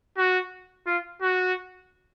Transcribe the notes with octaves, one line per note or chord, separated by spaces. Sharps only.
F#4
F4
F#4